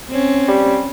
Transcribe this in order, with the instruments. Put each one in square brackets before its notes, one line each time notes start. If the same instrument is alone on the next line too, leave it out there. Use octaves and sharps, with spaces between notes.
[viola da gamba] C4 C#4
[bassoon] G3